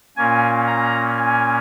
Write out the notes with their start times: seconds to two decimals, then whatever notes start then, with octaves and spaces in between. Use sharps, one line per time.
0.17 A#2 A#3 C#4 G#5
0.67 A#5
1.17 G#5